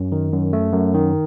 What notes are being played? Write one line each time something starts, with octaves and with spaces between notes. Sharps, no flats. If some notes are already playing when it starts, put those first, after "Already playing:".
Already playing: F#2
D#3
F#2
A3
F#2
D#3